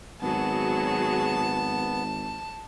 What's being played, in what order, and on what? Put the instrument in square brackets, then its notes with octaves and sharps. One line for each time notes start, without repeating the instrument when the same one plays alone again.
[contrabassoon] G#1 [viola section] F#3 F#4 G#4 [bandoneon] B3 [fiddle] A5